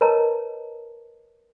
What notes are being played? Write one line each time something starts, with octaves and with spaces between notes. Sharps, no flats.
A#4 B4 C#5 D#5 A5 A#5